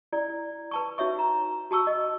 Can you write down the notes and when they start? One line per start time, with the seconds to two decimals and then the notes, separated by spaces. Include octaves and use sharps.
0.13 E4 D5
0.71 B4 A5 C#6
0.98 D#4 F#4 C#5 E5 C#6
1.19 A#5
1.71 F#4 A5 C#6 E6
1.87 D#5